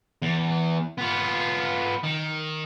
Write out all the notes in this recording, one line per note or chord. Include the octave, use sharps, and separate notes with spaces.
E2
B3 F4
D#3